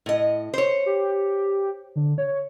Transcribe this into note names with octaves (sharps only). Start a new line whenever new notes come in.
A2 D#5
C5 C#5
G4
D3
C#5